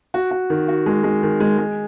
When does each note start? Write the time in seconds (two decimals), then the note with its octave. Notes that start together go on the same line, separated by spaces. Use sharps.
0.14 F#4
0.31 F#4
0.50 D#3
0.68 F#4
0.86 G#3
1.04 G#3
1.23 D#3
1.40 G#3
1.58 G#3